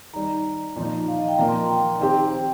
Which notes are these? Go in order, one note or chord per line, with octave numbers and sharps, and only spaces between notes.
D#3 G3 D#4 A#5
A#2 F3 D#4
F5
D#5
G5
A#2 F3 A#3 A#5
C6
A#5
G5
D#3 C4 G4
C5